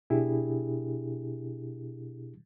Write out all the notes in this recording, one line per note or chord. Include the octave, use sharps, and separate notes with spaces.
B2 D4 E4 G4 G#4